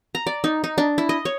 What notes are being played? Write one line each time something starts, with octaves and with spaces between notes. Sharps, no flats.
A#5
D5
D#4
D#4
D4
E4
D#5
C#5